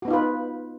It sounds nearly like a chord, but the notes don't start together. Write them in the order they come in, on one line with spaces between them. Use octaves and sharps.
F#4 B3 D#4 F4 B4